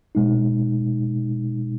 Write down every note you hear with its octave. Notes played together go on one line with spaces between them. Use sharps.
B2 G#3 D#4